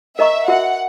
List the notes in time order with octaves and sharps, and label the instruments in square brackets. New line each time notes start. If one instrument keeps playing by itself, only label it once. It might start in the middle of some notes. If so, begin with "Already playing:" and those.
[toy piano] A#4 D#5 A#5 C#6 [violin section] E5
[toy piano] F#4 A#4 E5 [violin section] F#5